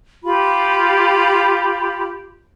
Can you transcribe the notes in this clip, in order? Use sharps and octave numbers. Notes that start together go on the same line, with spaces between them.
F4 G4 B5